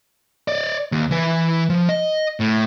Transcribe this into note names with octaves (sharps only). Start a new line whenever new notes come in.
D5 D#5
D#2
E3 B4
F3
D#5
A2